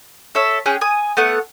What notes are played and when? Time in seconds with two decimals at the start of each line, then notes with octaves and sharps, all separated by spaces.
0.35 A4 C#5 E5
0.66 C#4 G#4 G5 F#6
0.81 G#5 D#6
1.17 A3 B3 F#5